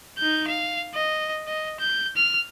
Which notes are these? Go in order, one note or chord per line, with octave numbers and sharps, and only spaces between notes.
D#4 G6
F5
D#5
D#5
G6
F6